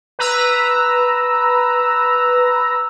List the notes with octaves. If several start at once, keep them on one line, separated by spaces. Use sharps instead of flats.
B4 A#5 E6